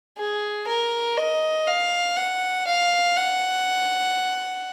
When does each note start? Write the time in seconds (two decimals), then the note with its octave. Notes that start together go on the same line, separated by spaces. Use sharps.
0.18 G#4
0.67 A#4
1.18 D#5
1.67 F5
2.17 F#5
2.67 F5
3.16 F#5